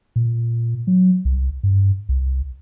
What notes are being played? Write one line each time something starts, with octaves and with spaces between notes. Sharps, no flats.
A#2
F#3
C2
G2
C2